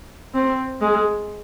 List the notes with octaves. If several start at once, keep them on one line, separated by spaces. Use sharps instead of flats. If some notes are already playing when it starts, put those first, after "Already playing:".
C4
G#3